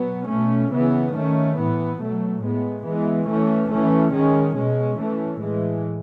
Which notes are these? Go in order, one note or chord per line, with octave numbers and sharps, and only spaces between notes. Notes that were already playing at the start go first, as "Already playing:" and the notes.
Already playing: B2 F#3 B3
B2 A3 C#4
C#3 E3 B3
D#3 A3 C#4
A2 E3 B3
B2 F#3 A3
A2 G#3 B3
E3 G#3 B3
E3 A3 C#4
E3 A3 C#4
D#3 G#3 C#4
B2 G#3 C#4
E3 A3 C#4
A2 E3 G#3